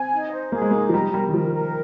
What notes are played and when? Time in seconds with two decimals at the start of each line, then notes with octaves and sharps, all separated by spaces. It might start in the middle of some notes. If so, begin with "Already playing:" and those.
Already playing: C4 G#5
0.12 D#4
0.32 C5
0.52 A#3 G#4
0.62 G#3
0.71 A#3 D#4
0.89 F3
0.93 G3 A#5
1.13 G3 A#4
1.29 D#3
1.34 F3 A#4
1.54 A#4